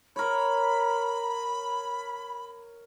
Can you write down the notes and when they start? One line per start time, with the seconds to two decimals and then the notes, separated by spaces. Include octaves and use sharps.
0.16 A#4 C#5 B5